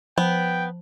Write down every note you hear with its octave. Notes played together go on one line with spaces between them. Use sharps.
F3 B3 G5